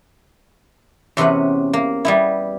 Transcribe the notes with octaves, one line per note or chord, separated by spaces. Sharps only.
E2 C3 C#4 B4 F#5
A#3
G3 B3 E4